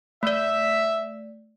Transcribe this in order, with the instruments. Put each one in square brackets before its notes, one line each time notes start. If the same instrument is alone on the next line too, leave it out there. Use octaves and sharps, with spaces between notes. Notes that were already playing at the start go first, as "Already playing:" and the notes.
[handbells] A3 D5 [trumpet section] E5